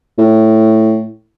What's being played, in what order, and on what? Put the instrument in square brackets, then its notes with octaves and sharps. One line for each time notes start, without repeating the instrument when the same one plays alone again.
[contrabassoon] A2